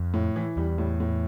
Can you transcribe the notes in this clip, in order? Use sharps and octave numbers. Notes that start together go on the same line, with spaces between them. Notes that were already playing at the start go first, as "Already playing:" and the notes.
Already playing: F2
A2
E3
E2 G3
A2
A2